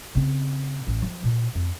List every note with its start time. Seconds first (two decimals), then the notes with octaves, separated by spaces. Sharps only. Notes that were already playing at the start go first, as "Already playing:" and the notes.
0.15 C#3 C4
0.87 A1
1.02 F3
1.23 A#2
1.55 F2